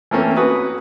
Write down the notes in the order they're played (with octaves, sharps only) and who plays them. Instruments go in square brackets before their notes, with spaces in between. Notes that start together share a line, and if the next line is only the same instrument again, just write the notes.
[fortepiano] E3 A3 A#3 C4 C#4
F#4 B4 D#6